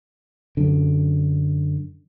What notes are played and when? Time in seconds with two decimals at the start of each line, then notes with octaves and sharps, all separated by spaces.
0.57 F#2 D3